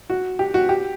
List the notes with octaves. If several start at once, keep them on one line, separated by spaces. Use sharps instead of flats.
F#4
G4
F#4
G4